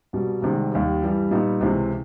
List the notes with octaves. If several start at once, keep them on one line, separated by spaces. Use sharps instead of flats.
C2 B2 G3
C2 C3 D#3 G#3
D#2 D#3 G3
G2 E3 G3
A#2 G3 B3 D#4
C#2 C3 E3